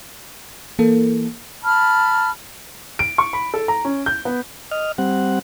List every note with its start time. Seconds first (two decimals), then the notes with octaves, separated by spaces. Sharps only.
0.79 E3 A#3 A4
1.63 A5 B5 F6
2.99 D7
3.18 C#6
3.33 B5
3.54 A4
3.68 A#5
3.85 C#4
4.06 G6
4.25 B3
4.71 D#5 F6
4.98 G3 C4 F#5